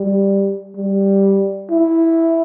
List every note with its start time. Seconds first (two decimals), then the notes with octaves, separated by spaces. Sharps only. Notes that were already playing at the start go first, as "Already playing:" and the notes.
Already playing: G3
0.76 G3
1.71 E4